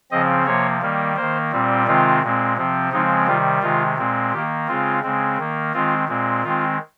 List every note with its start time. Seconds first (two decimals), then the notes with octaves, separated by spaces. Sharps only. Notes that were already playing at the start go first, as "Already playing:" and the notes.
0.11 C#3 F3 C4 D#5
0.46 C3 F3 A#3 C#5
0.82 D#3 G3 A#3
1.16 D#3 A#3 C5
1.52 A#2 G3 C4
1.87 C3 D#3 G#3 C4 F4
2.22 A#2 G#3 C4
2.57 C3 F3 C4
2.92 C#3 F3 G#3 C4 D#4
3.27 C3 D#3 G3 F4
3.62 C3 D#3 G#3 F4
3.97 A#2 G#3 C4
4.32 D#3 A#3 G4
4.67 C#3 G#3 C4 F4
5.03 C#3 G#3 C4
5.38 D#3 A#3
5.73 D#3 G#3 C4 F4
6.08 A#2 G#3 C4
6.44 D#3 G#3 C4 F4